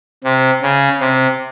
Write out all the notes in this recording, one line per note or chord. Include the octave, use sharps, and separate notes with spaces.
C3
C#3
C3